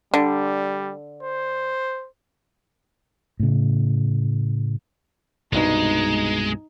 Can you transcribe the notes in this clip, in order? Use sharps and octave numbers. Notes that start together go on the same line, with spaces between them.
D3 G3
C5
A2 C#3
C2 G2 B2 G#3 D#4